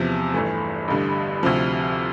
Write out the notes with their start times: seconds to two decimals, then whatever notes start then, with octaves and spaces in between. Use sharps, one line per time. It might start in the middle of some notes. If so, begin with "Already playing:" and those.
Already playing: E2 C3 F3
0.33 G1 G2 E3 A3
0.88 A1 G2 D3 G3
1.43 D2 C3 F3